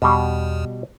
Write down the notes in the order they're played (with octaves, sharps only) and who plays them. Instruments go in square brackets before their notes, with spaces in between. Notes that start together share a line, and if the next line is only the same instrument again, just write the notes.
[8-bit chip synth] E2 [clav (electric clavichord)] B2 G3